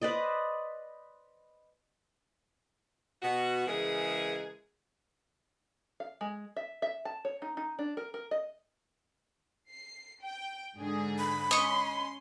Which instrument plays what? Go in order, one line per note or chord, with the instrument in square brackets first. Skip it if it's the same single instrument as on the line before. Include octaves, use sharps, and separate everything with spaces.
[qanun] B4 C5 D5 D#5
[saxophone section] B2 F#4
C#3 E3 G#3 G#4 A#4
[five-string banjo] F5
G#3
E5
E5
A5
C#5
D#4
D#4
D4
A#4
A#4
D#5
[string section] C7
G5
G#2 D3 G#4
[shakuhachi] B5
[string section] C#4 C6 [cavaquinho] D#5 C#6